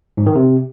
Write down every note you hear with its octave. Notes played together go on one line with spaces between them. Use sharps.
G#2
D#3
C3